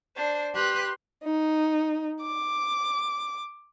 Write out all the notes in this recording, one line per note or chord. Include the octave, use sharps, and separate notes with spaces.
D4 C5
G4 B4 C6 F#6
D#4
D6